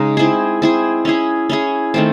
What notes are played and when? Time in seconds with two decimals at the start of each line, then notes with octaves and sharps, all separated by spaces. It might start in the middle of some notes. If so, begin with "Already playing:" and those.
Already playing: C#3 G#3 D#4
0.17 C4 E4 G#4
0.62 C4 E4 G#4
1.05 C#4 E4 G#4
1.50 C#4 E4 G#4
1.94 D#3 A3 C4